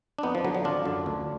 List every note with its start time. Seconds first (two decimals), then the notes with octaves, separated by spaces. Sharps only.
0.19 D4
0.23 F2 B3 D#4
0.35 F3
0.45 D3 F#3
0.55 F#3
0.64 G#1 D4 F4
0.85 F#2 D3
1.06 D2